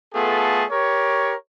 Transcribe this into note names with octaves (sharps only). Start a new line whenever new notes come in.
A3 B3 F4 G#4 A4
G4 A#4 C#5